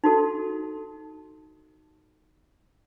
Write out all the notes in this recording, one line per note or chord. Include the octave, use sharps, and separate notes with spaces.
D#4 F#4 A4